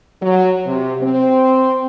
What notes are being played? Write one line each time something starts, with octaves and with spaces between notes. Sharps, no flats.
F#3
C3
C4